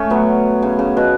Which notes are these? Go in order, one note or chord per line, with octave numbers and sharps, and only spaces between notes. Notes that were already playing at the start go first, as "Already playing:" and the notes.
Already playing: A3 C#4
F#3 B3
C#3
C#3
B2